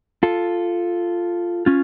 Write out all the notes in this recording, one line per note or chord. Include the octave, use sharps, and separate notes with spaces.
F4 A4
C#4 F4